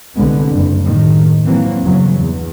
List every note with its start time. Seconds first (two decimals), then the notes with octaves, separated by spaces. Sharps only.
0.15 C2 D3 G#3 B3
0.49 F#1 E2 G2 G3
0.81 D#2 A2 D#3
1.44 E3 F#3 A#3 C4
1.82 E2 G2 C#3 F#3
2.17 E2